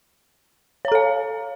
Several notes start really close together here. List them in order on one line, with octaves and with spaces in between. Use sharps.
C#5 A#5 A4 F5